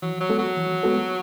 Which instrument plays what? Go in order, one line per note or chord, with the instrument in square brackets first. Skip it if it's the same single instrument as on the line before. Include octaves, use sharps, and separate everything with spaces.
[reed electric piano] E3 [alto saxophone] F#3
[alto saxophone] F#3
[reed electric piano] G#3 B3 F#4 A4
[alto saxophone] F#3
[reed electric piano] E3
G#3 B3 F#4 A4